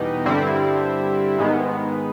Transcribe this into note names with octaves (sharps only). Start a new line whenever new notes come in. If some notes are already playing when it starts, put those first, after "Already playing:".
Already playing: E2 B2 G3 B3 D#4
G2 D3 G3 C4 E4
G#2 D#3 G#3 B3